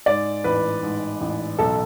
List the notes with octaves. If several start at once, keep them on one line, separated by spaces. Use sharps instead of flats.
G#2 D5
A1 B4
G#2
A1
B1 A4